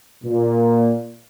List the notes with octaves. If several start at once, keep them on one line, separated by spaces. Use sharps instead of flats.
A#2